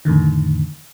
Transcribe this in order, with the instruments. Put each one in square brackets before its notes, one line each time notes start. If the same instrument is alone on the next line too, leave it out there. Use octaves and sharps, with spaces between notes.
[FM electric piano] F2 A2 D3 D#3